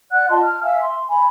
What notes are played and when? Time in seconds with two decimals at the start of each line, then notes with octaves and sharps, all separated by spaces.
0.11 D5 F#5 F#6
0.29 F4 D#5 A5 C6
0.42 F6
0.62 E5 F5 G#5 E6
0.80 C6
1.08 G#5 B5